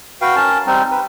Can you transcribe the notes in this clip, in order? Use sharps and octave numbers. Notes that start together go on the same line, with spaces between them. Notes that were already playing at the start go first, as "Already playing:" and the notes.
F#4 B4 F5 G5
C#4 A#4 A5
G3 C4 D#4
B4